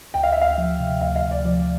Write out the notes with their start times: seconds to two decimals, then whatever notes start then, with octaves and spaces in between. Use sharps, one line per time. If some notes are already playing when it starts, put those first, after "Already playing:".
0.14 D2 G5
0.23 F5
0.32 D2 E5
0.41 F5
0.58 F3
0.80 C3
1.01 D2 F5
1.16 F5
1.23 D2
1.31 D5
1.45 F3 D5